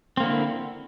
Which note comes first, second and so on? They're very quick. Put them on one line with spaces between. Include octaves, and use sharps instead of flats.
C4 A#3 D3 E4